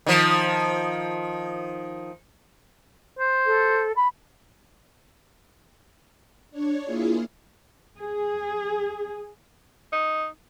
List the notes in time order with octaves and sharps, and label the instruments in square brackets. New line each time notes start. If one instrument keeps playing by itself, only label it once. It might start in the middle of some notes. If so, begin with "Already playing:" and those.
[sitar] D#3 F3
[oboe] C5
[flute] A4
B5
[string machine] D4 C#5
A#3 E4 F4 G#4
[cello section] G#4
[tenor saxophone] D#4